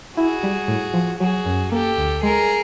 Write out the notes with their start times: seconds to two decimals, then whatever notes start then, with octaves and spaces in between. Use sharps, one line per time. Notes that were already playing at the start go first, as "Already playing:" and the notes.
0.16 E4 F#4 G#4
0.43 G3
0.68 A2
0.94 F3
1.19 F#3 F#4 G#4
1.46 F#2
1.71 A#3 G4 A4
1.97 D2
2.23 G#3 G#4 A#4